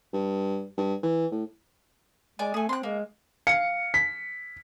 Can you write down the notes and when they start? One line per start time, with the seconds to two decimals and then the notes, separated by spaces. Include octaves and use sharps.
0.13 G2
0.77 G2
1.03 E3
1.31 A2
2.39 G#3 D5 G#5
2.54 A3 G#4 G#5
2.69 C4 C6 F#6
2.83 G#3 A#3
3.47 F5 C#7
3.94 B6